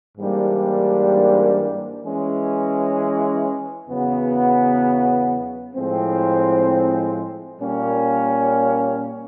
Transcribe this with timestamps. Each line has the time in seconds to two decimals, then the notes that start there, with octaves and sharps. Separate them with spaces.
0.17 G#2 E3 G3 A#3 D4
2.03 E3 G#3 C#4
3.89 E2 C#3 F#3 B3
5.74 A2 F3 G#3 C4
7.60 A#2 G3 A#3 C#4